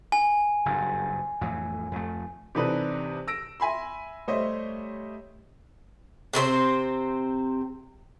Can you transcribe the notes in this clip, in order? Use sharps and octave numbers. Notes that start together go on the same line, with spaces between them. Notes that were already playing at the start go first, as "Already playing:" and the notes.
G#5
F#1 G2
F2 A2 E3
F2 A3
C3 E3 D4 D#4 A4 B4
E6 A#6 D7
E5 G#5 B5 C6
G3 A3 C5 C#5 D#5 E5
C3 C4 A4 C5